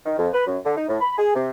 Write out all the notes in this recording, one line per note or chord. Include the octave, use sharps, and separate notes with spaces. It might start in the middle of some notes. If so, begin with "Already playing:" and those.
D#3
F2
B4
F#2
D3
D#4
A2
B5
G#4
C3